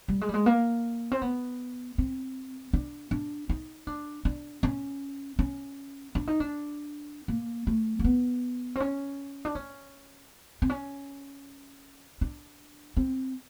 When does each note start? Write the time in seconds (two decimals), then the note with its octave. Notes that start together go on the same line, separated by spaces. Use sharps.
0.08 G3
0.21 G#3
0.29 G3
0.34 G#3
0.46 A#3
1.12 C4
1.22 B3
1.98 C4
2.73 D4
3.11 D4
3.49 D#4
3.87 D4
4.25 D4
4.63 C#4
5.39 C#4
6.15 D4
6.28 D#4
6.40 D4
7.28 A#3
7.67 A3
7.99 A#3
8.04 B3
8.76 C4
8.80 C#4
9.45 D4
9.55 C#4
10.62 C4
10.70 C#4
12.21 D4
12.97 C4